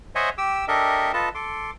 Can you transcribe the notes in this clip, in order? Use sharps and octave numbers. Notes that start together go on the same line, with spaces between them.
C5 C#5 D#5 E5 F#5 G#5
G4 D6 E6
D4 G4 A4 A#4 D#5 E5
F4 A4 B4 D#5 A5
A4 C6 D6